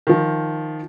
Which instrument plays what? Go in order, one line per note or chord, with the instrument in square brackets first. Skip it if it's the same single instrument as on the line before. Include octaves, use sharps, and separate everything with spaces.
[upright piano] D#3 F3